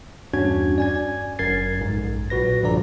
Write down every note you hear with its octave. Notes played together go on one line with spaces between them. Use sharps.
E2 G2 C#4 D4 F#4 G#6
D5 G#5 G#6
G1 F#2 A#4 G#6 A6 C7
A#1 G#2
B1 A#2 F#4 B4 A#6
G2 D3 F3 D5 A#5